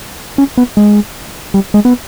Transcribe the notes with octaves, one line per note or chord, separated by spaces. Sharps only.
C#4
B3
G#3
G3
G#3
B3